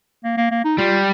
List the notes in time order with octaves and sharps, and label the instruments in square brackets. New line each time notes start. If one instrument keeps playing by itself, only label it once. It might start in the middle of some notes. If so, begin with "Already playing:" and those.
[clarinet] A#3
A#3
A#3
D#4
[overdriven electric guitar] G3 [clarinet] F4